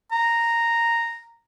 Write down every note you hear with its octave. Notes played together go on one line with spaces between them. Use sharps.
A#5